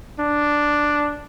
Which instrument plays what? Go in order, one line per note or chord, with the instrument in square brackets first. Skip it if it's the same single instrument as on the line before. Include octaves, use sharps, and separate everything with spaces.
[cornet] D4